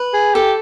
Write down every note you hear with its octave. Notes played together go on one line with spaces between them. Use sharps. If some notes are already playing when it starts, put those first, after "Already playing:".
Already playing: B4
G#4
G4 A4